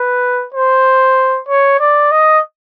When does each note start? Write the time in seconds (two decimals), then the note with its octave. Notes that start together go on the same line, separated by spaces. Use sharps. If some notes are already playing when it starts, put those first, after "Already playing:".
Already playing: B4
0.54 C5
1.48 C#5
1.80 D5
2.11 D#5